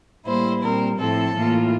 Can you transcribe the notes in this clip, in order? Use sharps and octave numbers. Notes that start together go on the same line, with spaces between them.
A2 G3 A#3 E4 C5
A#2 G3 C4 A#4
A2 F3 C4 E4 A4
A2 E3 A#3 F4